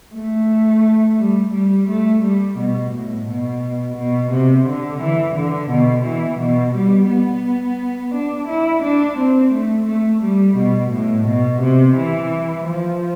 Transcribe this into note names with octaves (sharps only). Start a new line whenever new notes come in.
A3
G3
G3
A3
G3
B2
A2
B2
B2
C3
D3
E3
D3
B2
E3
B2
G3
B3
D4
E4
D4
C4
A3
A3
G3
B2
A2
B2
C3
E3
F3